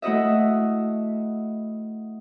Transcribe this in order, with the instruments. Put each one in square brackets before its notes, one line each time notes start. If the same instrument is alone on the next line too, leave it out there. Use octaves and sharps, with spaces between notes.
[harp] A3 E4 F#4 D#5 E5